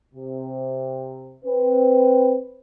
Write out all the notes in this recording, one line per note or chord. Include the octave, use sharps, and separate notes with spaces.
C3
C4 B4